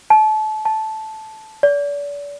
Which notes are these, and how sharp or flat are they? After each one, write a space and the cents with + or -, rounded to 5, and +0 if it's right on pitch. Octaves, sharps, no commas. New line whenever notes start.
A5 -30
A5 -10
D5 -40